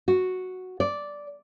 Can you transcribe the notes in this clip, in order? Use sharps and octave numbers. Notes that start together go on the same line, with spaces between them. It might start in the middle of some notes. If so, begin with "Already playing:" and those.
F#4
D5